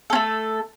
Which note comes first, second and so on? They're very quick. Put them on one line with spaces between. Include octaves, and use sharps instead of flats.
A4 C#4 A3